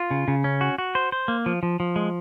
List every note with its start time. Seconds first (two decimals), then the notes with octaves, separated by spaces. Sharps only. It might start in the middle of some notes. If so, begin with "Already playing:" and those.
Already playing: F4
0.11 C#3
0.28 C#3
0.44 C#4
0.61 F#4
0.78 F#4
0.95 C5
1.12 C5
1.28 A#3
1.46 F3
1.63 F3
1.80 F3
1.96 G#3